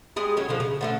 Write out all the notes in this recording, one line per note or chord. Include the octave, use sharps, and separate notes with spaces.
G3 G#3 G#4
F#3 C#4 C#5
D3 F3
C#3
D3 A3 C#4